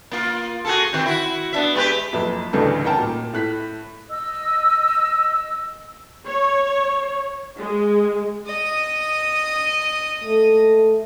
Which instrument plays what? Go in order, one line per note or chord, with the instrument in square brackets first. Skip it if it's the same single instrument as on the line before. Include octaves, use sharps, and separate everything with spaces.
[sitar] A#3 F4
F#4 G#4 A4
D#3 C4
E4 F#4
B3 D4 E5
G#3 G4 B4
[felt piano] F#1 F2 B4 E5
A1 D2 G2 C#3 A4 B4
C#4 D#4 A#4 F#5 G5 A5
A#2
A2 F#6 B6
[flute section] D#5 E6
[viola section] C#5
G#3
[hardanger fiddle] D#5 D#6
[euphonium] A3